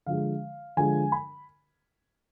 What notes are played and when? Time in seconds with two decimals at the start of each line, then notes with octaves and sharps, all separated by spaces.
0.06 D3 F3 G#3 F5
0.77 D3 F3 G#3 G#5
1.12 B5